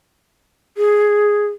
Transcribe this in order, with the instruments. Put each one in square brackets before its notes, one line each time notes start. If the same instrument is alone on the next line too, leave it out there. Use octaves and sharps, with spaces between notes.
[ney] G#4